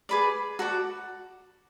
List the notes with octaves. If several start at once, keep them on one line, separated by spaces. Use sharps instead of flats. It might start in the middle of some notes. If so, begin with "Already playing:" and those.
G#4 B4 D5
F#4 A4 D5